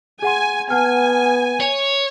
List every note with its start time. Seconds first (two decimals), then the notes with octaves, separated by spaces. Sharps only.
0.22 G#4 F#5 G#5 C6
0.70 B3 F#5 G#5 A5 F6
1.60 C#5 F7